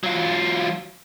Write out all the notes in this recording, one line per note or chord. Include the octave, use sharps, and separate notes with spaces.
F#3 F4